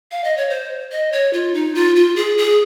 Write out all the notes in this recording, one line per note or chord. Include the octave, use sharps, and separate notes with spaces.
F5
D#5
C#5
C5
D#5
C#5
F4
D#4
F4
F4
G#4
G#4